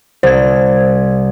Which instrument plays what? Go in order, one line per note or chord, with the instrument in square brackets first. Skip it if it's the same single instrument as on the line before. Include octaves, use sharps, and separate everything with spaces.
[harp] C2 [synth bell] C5 G#6